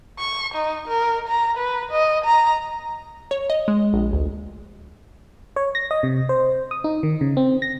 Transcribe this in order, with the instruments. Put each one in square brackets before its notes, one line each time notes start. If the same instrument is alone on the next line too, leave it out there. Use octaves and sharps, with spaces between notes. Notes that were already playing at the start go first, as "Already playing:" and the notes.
[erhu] C#6
D#4
A#4
A#5
B4
D#5
A#5
[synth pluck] C#5
D#5
G#3
A#1
D2
[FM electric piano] C#5
A#6
D#5
C3
C5
D#6
D#4
D#3
C#3
C4
A#6